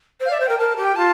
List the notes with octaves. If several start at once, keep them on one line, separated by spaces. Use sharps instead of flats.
C5
F5
D5 E5
C5
A#4 G5
A#4 A5
G4
G5
F4 A5